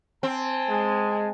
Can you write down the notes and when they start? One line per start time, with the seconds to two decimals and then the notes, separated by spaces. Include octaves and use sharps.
0.23 C4 G#5 A5
0.69 G#3